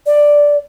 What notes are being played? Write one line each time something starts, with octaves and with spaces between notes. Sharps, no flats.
D5